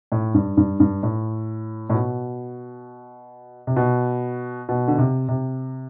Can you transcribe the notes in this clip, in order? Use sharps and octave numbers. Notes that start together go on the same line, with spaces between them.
A2
G2
G2
G2
A2
A2
B2
C3
B2
B2
D3
C3
C3